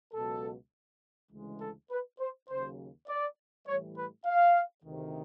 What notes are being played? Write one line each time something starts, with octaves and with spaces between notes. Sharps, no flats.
C#2 B2 F#3 A4
D2 C#3 E3 G#3
A4
B4
C5
D#2 C#3 F#3 C5
D5
A2 E3 G3 C#5
B4
F5
D2 C3 D#3